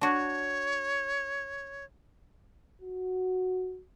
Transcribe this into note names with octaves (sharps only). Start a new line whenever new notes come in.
D4 F#4 C#5
F#4